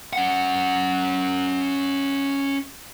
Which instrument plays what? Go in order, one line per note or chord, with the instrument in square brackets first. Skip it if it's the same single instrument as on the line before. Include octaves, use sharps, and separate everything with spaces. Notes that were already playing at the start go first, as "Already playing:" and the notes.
[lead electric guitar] C#4 F#5